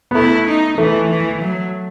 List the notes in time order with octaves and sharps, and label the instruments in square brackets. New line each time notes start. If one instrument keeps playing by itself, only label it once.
[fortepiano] B3
[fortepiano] A3 [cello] E4
[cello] D#4
[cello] E3 [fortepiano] A3
[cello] E3
F#3